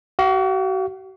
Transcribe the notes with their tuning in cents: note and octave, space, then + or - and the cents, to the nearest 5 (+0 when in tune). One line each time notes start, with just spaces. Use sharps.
F#4 +40 F5 +0